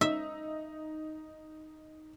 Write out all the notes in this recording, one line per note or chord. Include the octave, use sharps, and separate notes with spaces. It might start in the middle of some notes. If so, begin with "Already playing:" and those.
D#4 E5